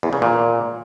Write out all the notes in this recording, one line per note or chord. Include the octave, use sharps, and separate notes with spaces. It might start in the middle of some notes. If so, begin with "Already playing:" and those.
E2
C#3
A#2